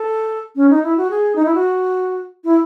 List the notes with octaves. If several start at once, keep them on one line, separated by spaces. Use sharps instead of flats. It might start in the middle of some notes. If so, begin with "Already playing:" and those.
Already playing: A4
C#4
D#4
E4
F#4
G#4
D#4
E4
F#4
E4